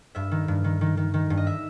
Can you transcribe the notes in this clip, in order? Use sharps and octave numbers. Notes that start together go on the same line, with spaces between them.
G2 E5
D#3
G2
D#3
D#3
D#3
D#3
G2
D#5
E5